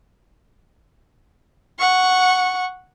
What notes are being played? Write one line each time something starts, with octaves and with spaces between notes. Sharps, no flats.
F#5 C#6